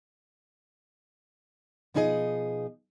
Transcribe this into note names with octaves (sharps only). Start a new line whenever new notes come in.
B2 F3 D#4 E4 G#4 D#5